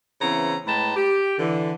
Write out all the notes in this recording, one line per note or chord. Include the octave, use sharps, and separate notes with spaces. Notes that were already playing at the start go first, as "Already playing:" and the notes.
C#3 E3 B3 C4 E4 A#5
A2 G#3 B4 G5 A5 A#5
G4
D3 E3